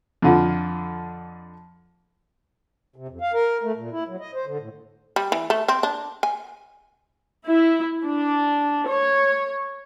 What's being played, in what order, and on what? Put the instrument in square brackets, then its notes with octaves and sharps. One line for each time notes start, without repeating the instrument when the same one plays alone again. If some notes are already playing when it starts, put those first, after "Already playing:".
[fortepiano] F2 D3 F3
[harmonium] C3
F2
F5
A#4
A3
A#2
E4
F#3
D#5
C5
D3
A2
[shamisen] G3
E3
A3
C4
D4
G#5
[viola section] E4
D4
C#5